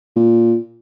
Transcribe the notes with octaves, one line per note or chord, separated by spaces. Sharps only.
A#2